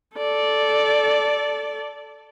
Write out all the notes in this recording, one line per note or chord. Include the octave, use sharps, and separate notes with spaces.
A4 D5